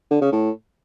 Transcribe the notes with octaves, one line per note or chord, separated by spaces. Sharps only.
D3
C#3
A2